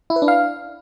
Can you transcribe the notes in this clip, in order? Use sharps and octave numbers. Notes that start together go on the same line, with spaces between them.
E4
B4
D4
F5